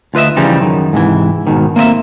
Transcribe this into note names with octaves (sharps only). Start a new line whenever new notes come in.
D2 F4 B4 D#5 E5
C#3 E3 F3 G3 D#4
F#2 D#3
G#2 C3 E3
G#2 B2 D#3
A#3 C4 D#5 E5